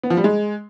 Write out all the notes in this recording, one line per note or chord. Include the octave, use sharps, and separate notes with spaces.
B3
F3
G3
G#3